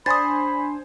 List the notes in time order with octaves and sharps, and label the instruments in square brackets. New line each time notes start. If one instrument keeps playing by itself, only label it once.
[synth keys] D4 [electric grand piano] C5 G#5 C6 [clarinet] B5 [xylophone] D#6 A6